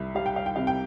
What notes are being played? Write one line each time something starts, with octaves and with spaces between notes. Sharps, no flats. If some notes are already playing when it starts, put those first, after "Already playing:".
Already playing: C2 E5
G3 F5
G5
F5
G5
C3 F5
G5